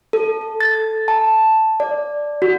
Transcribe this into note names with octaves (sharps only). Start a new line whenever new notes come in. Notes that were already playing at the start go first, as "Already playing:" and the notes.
A4
A4
A6
A5
D5
F#4